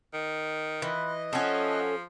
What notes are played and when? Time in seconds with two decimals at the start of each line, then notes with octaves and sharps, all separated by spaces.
0.14 D#3
0.82 E3 F4 B4 D#5
1.33 F3 A3 C#4 A4 F#5